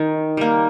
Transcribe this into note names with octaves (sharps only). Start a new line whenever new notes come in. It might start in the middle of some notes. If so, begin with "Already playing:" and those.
Already playing: D#3
G3 A#3